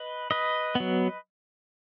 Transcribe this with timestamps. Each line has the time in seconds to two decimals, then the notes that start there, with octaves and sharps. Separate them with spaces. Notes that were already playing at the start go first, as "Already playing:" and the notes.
Already playing: B4 D#5
0.31 B4 D#5
0.75 F#3 B3